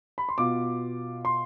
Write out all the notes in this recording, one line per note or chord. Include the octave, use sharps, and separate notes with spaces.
B5
C6
B2 B3 F4 D6
C6